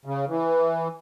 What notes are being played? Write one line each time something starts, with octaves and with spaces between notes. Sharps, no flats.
C#3
E3